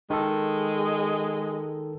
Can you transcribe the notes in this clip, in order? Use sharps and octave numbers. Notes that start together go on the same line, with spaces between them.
D#3 G#3 A4